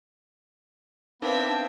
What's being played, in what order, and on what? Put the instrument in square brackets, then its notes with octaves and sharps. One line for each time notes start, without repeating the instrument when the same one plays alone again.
[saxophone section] B3 C4 [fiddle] D4 E5 [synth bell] D#4 A#4 B4 [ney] F5